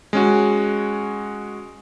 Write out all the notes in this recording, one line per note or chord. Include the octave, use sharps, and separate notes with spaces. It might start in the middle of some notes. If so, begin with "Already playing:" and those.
G#3 C#4 F#4